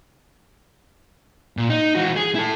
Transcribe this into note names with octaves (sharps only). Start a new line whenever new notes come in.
A#2
D#4
E3 F#4
G#4
E4 A4